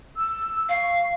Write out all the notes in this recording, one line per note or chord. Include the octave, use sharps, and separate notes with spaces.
E6
F5 C#6